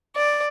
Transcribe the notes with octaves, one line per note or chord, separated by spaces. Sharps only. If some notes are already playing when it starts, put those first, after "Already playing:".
D5